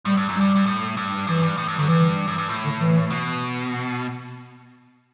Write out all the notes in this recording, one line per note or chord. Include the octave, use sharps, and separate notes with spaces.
A2 G3
G2
F#2
G2 G3
G2
A2
G2
F#2 E3
G2
A2
G2
F#2 D3
G2 E3
F#2
G2
A2
D3
E3
B2